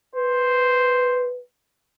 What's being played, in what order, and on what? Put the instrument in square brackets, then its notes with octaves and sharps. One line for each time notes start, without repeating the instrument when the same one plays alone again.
[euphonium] B4 [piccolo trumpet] C5